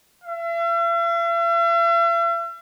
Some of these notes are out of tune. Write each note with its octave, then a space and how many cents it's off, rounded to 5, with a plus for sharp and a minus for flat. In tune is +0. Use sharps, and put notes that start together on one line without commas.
E5 +45